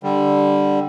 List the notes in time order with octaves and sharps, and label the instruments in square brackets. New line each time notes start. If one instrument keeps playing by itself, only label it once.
[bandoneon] D3 G3